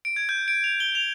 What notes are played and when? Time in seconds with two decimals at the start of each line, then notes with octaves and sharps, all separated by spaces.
0.05 D7
0.16 G#6
0.29 G6
0.48 D7
0.64 F7
0.80 G7
0.95 F7